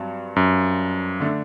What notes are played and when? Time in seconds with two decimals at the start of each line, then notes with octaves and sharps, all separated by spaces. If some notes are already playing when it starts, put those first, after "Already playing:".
Already playing: G2 F#3 C4
0.36 F#2
1.20 D3 A3 D4